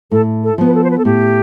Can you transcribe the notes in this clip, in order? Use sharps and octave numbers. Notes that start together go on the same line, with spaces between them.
A2 A4
A4
F3 B3
B4
A4
C5
B4
A4
A2 G4